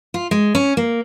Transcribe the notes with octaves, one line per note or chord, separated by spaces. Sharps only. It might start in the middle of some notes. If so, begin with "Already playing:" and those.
F4
G#3
C#4
A#3